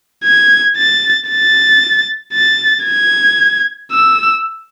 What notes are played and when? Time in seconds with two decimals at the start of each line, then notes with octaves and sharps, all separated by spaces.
0.24 G#6
0.77 A6
1.29 A6
2.33 A6
2.86 G#6
3.91 E6